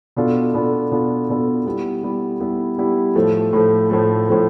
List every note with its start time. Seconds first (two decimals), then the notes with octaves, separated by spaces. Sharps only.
0.16 B2 B3 D4 F4 A4
0.54 B2 B3 D4 F4 A4
0.91 B2 B3 D4 F4 A4
1.29 B2 B3 D4 F4 A4
1.66 G3 B3 E4
2.03 G3 B3 E4
2.40 G3 B3 E4
2.78 G3 B3 E4
3.16 A2 F3 A3
3.53 A2 F3 A3
3.90 A2 F3 A3
4.28 A2 F3 A3